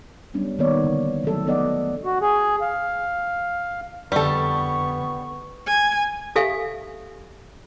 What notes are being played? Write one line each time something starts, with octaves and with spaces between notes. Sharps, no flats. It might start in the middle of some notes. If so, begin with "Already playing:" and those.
F#3 G3 B3 C#4 D4
D#3 A#3 B3 C#5 D5
D3
D#3 F#3 A3 D4 A4
F#3 B3 A4 D5 D#5 F#5
F#4
G#4
F5
F2 D3 G3 B3 A4 C#6
G#5
G4 A4 E5 F5 G#5